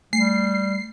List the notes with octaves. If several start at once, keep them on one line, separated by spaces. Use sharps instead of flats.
G3 A3 C7